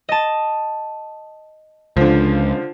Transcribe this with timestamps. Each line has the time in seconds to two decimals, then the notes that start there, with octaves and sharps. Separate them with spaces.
0.09 D#5 A5
1.97 C#2 D3 F3